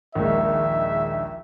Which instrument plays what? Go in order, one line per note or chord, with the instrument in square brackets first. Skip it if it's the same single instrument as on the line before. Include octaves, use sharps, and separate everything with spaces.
[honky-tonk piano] A#1 D#2 G#3 [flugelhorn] E5